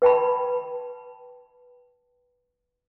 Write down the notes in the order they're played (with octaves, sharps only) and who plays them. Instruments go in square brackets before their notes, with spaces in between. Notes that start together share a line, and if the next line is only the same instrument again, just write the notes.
[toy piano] B4 G5 A5 B5